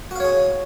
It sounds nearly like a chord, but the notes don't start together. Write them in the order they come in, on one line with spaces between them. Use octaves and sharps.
F#4 F5 C#5 G#4